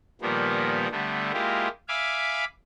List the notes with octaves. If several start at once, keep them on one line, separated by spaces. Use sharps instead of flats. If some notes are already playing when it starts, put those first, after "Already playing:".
A#2 D#3 F3 G3 A#3 B3
D3 G3 A3 B3
G#3 A#3 E4 F4 G4
E5 F5 G#5 B5 D6